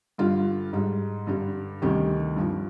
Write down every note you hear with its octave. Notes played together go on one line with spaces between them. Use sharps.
G2 D3 G3 F4
G#2 G3
G2 D3 G3
D2 C3 D#3 G3 G4
G2 F3